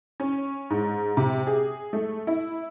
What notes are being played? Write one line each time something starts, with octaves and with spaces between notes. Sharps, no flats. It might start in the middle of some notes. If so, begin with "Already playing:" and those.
C#4
G#2
C3
G#4
A3
E4